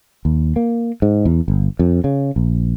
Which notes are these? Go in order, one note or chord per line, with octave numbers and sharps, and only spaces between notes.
D#2
A#3
G#2
E2
G1
F2
C#3
A#1